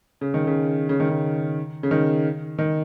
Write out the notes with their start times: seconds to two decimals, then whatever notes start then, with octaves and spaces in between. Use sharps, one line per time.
0.21 C#3
0.34 D#3
0.47 C#3
0.89 C#3
1.00 D#3
1.10 C#3
1.83 C#3
1.91 D#3
2.59 D#3